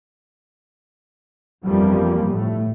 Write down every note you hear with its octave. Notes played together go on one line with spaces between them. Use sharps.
G1 F2 E3 F3 G3 A#3
A2 A3